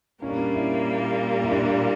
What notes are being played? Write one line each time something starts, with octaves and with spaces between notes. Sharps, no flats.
A#2 G3 A#3 C#4
D4
C#4
E4
E4
D4